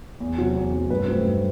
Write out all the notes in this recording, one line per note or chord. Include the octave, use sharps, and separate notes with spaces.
E2
C3 F#3
E2
C3 F#3
G2 B4
F#3 A3 C4
G2